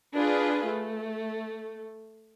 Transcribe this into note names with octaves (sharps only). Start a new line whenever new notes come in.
D4 F4 G#4 B4
A3